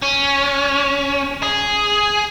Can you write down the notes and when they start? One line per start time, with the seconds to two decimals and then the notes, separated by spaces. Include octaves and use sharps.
0.02 C#4
1.43 G#4